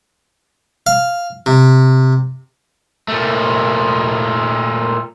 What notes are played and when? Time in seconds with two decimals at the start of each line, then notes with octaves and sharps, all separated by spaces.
0.87 F5
1.46 C3
3.08 A#2 A3